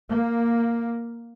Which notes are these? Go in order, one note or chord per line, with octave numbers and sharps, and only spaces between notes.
A#3